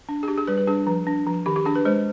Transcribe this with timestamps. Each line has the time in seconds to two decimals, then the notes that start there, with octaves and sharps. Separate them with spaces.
0.09 D4
0.23 G#4
0.28 D4 G4
0.38 G#4
0.47 G3 B4
0.58 B4
0.67 D4 G#4
0.87 F3
1.07 D4
1.27 F3
1.46 D#3 G4
1.56 G4
1.65 D4 G#4
1.76 B4
1.85 G#3 C5